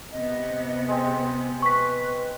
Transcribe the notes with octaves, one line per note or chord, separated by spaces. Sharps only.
C3 B3 D#5
G#3 C4
B4 C#6 B6